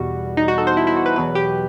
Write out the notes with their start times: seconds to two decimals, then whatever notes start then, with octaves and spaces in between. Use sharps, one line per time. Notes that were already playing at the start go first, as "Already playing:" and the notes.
Already playing: E2 B2 G3 F#4
0.37 D#4
0.48 F#4
0.58 A4
0.67 C5
0.77 E4
0.87 E4
0.96 F#4
1.06 B4
1.16 E2 B2 F#3 B4
1.35 G4